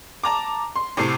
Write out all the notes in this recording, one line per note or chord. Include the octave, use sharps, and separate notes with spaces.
A5 A#5 D6
C6
A2 C3 A3 C7